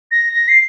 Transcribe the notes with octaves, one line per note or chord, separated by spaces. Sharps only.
A#6
A#6
C7